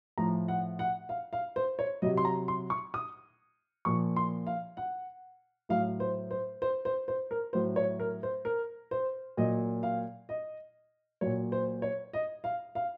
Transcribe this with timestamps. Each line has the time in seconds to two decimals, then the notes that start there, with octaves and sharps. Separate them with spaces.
0.18 A2 F3 A#5
0.48 F#5
0.79 F#5
1.09 F5
1.33 F5
1.56 C5
1.79 C#5
2.02 C3 F#3 D#5
2.17 C6
2.25 A#5
2.48 C6
2.70 C#6
2.94 D#6
3.85 A#2 F3 C#6
4.16 C6
4.47 F5
4.77 F#5
5.69 A2 F#3 F5
6.00 C5
6.31 C5
6.62 C5
6.85 C5
7.08 C5
7.31 A#4
7.53 A2 F#3 C5
7.76 C#5
8.00 A#4
8.23 C5
8.45 A#4
8.91 C5
9.37 A#2 F#3 D#5
9.83 F5
10.29 D#5
11.21 A#2 F#3 C#5
11.52 C5
11.82 C#5
12.13 D#5
12.44 F5
12.75 F5